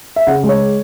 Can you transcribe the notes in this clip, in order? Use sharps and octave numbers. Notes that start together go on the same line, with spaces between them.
E5
C#3 F#5
G#3
C#5